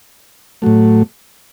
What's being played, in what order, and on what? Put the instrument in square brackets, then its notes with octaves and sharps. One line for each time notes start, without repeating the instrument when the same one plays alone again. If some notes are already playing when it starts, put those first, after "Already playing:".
[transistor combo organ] A2 F#3 A3